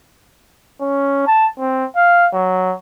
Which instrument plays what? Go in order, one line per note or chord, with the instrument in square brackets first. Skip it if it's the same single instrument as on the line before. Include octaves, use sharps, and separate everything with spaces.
[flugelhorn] C#4
A5
C4
F5
F#3